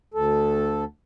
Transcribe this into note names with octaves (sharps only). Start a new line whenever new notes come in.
D2 A4